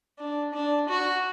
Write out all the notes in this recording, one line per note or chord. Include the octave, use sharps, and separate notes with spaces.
D4
D4
F#4